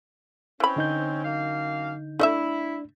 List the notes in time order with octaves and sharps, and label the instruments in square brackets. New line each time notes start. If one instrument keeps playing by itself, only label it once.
[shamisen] E3 B5 [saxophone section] C4 C#4
[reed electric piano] D3 D#4 G6
[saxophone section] F#2 A#3 F5
[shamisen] A3 D#5 E5 [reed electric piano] D4 [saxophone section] E4